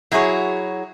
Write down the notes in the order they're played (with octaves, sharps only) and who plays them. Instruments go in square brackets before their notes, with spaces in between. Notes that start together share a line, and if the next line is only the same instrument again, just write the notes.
[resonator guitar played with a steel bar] F#3 E4 F#4 G#4 C#5